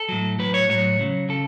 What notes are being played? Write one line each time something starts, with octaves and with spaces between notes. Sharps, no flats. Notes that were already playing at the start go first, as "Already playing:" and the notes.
Already playing: A4
A2 F#3
A2 F#3 B4
C#5
A2 F#3 C#5
C#3 F#3
C#3 A4